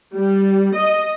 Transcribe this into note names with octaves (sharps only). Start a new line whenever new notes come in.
G3
D#5